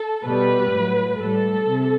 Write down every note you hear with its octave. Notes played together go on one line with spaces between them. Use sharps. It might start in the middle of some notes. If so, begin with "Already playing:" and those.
Already playing: A4
B2 G3 B4
A2 F#3
A2 G3 A4
C3